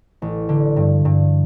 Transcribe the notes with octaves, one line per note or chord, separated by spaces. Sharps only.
A1
D3
G2
G2